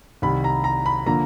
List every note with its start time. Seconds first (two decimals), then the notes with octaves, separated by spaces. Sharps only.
0.22 C2 C3 D#3 B5
0.44 A#5
0.64 A#5
0.86 B5
1.06 D3 F3 A#3 A#5